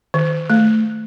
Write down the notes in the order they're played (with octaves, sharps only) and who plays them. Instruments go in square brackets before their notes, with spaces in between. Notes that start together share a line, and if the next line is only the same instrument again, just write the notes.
[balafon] D#3
A3